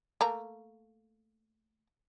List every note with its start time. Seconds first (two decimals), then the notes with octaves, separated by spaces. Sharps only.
0.21 A3 A#3 A#5